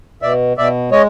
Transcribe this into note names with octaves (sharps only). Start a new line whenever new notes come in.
B2 D5 E5
B2 D5 E5
G#3 C#5 D#5